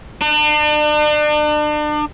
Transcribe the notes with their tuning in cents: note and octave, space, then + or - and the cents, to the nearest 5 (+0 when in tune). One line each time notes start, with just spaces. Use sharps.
D4 +40